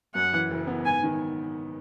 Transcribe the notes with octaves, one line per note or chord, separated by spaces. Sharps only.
F#2 F#5
E3
F#1
B3
G#2 G#5
D#3